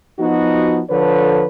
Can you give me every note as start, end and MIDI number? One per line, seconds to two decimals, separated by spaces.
0.20 0.81 53
0.20 0.81 59
0.20 0.81 63
0.20 0.81 66
0.90 1.46 50
0.90 1.46 53
0.90 1.46 69
0.90 1.46 71
0.90 1.46 73